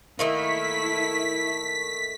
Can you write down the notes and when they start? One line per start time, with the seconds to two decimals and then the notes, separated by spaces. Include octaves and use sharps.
0.19 D#3 A3 A#3 E4 B6